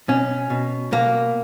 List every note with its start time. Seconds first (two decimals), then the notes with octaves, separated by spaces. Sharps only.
0.08 B2 C#4
0.50 B2
0.92 B2 A#3